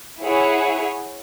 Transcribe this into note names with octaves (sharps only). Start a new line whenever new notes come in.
E4 G#4 C#5 F#5